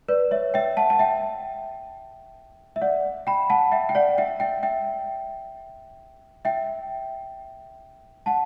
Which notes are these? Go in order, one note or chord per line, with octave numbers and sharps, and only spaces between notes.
B4 D5
C#5 E5
E5 G5
F#5 A5
A5
E5 G5
E5
D5 F#5
G5 B5
F#5 A5
E5 G5
G5
D5 F#5
E5 G5
E5 G5
E5 G5
E5 G5
F#5 A5